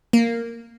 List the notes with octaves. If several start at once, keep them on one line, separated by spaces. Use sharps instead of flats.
A#3